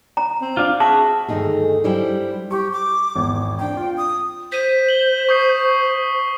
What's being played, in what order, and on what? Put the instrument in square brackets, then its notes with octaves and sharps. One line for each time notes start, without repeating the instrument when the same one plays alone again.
[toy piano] A#5
[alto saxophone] C4
[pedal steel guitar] D4 F4
[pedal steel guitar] F#4 E5 [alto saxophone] G#4 [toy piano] A5
[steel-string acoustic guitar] D2 G2 D#3 A3 D#4 G#4
G2 F#3 G3 E4 C5 G5
[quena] G4 [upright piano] C#6
[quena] D6
[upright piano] G#1 E2
[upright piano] C4 D4 [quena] G5
[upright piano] F4
[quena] D#6
[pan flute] C5 [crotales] B6 D#7
[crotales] F#7 G7
C#6 D#6 C7